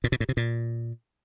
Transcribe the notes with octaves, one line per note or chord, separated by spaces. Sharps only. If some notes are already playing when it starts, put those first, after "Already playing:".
A#2
B2
A2
C3
A#2